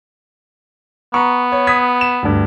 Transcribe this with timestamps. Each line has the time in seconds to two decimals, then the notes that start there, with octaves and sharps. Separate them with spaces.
1.14 B3 A#5 C#6
1.52 C#5
1.67 D#6 G#6 B6
2.01 E7
2.22 D2 G2